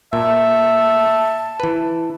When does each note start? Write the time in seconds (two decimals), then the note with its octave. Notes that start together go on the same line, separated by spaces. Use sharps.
0.13 A#2 E5 A5
1.60 E3 B4